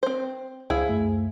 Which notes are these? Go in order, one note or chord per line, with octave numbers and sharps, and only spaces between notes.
C4 C5
C#2 E4 G#4 C5 F5
F#2 A3